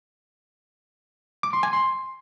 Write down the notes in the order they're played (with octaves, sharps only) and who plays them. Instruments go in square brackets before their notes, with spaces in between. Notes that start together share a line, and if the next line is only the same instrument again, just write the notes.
[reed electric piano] D6
C6
G#5
C6